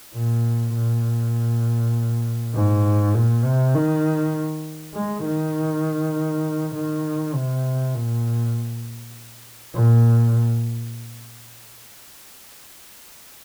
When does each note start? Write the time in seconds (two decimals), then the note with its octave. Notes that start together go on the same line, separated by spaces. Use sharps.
0.14 A#2
0.74 A#2
2.54 G#2
3.15 A#2
3.44 C3
3.74 D#3
4.95 G#3
5.25 D#3
6.75 D#3
7.34 C3
7.95 A#2
9.75 A#2